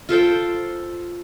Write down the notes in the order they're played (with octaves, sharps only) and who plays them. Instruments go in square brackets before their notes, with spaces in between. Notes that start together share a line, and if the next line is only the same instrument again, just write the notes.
[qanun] F4 A4 C5 G5